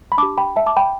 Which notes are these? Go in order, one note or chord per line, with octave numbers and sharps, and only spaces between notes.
B5
D4 A5 D6
G4
G5 B5
E5 A5
A5 D6
G5 B5